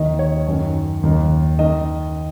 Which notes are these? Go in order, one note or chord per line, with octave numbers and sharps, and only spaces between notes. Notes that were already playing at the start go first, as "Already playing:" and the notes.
Already playing: D#2 D#3 D#5
C#5
F#2 D#3
D#2 D#3
D#3 D#5